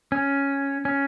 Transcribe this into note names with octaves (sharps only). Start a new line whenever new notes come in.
C#4
C#4